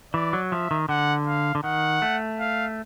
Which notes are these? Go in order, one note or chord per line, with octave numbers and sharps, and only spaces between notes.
E3 D5
F#3
F3 E5
D#3
D3 F#5
F5
D3
D#3 F#5
A3
F5